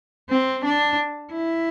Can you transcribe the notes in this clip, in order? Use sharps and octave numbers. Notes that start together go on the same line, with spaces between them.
C4
D4
E4